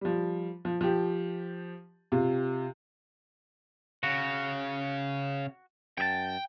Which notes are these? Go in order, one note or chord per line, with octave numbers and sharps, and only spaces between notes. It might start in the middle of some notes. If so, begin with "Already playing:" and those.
F3 G3
F3
F3 G4
C3 F4
C#3 F#4
F#2 G#4 G5 A5